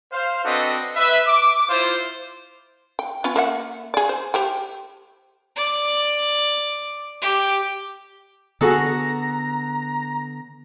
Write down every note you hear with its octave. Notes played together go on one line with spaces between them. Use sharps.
C5 F5
C4 D4 F#4 A4 B4 D#5
B4 E5
D6
E4 F4 C5
G5
B3 C#4 F4
A#3 E5 F#5
G#4 D5
C5
G4 C5 G5
D5
G4
D3 B3 F#4 G#4 A4 A#5